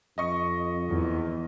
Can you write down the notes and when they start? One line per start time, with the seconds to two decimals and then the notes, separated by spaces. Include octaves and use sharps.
0.18 F2 D#5 C#6
0.89 E2